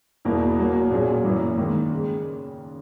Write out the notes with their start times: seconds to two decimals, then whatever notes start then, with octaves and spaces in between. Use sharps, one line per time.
0.25 E2 B2 A#3 E4 A#4
0.58 B2 F#3 A#3
0.91 A#2 F#3 C#4 G#4
1.24 F#2 E3 A#3
1.57 G#2 D#3 A#3
1.91 C#3 G#3